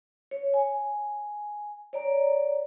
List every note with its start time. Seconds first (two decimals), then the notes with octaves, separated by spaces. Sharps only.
0.31 C#5
0.54 G#5
1.93 C#5 D5 A#5